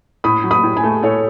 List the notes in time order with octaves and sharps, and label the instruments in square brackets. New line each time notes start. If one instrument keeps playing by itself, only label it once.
[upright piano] A2 [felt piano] B5 D#6
[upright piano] F#3
[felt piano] B5 D#6
[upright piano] A2
[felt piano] G#5 B5
[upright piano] A3
[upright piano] A2 [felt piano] A4 C#5